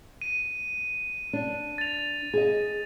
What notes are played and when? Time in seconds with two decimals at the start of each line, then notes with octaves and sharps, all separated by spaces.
0.22 D#7
1.33 D4
1.78 A6 F7
2.34 G#4 D#5